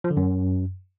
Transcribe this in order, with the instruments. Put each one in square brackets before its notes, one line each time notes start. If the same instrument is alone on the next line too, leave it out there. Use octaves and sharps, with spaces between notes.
[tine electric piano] F3
D3
F#2